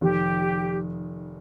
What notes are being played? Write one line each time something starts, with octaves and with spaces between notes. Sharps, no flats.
F1 F2 D#3 G4